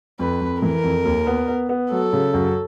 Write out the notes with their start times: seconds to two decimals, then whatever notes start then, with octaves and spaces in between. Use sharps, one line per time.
0.19 F2 B4
0.41 F2
0.62 E3 A#4
0.84 F2
1.05 D#2
1.27 B3
1.48 B3
1.69 B3
1.91 F#3 A4
2.13 C#3
2.34 F#2